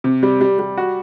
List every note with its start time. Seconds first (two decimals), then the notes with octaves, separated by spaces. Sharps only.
0.04 C3
0.23 G3
0.41 G3
0.59 G3
0.77 F#4